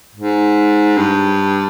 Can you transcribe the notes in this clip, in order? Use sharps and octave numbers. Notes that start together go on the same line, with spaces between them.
G#2
G2